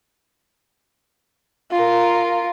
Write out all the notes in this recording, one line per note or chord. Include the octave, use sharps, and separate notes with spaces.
F4 A#4